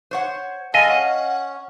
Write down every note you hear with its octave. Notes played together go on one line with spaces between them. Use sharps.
C5 C#5 F#5
G#3 A4 D#5 F5 G#5 A5
C#4 F#5